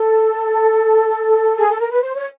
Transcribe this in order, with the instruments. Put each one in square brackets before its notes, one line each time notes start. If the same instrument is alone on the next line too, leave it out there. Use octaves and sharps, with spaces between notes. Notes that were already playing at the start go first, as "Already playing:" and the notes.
Already playing: [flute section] A4
G#4
A4
A#4
B4
C5
C#5